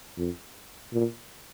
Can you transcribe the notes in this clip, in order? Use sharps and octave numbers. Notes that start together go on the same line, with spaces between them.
F2
A#2